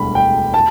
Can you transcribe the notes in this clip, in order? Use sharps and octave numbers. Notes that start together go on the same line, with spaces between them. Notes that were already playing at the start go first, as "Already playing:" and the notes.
Already playing: E1 D2 D3 G3 B5
G5
A5